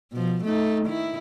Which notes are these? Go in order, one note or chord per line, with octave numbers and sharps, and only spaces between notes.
B2 F3
A3 D#4
D#3 E4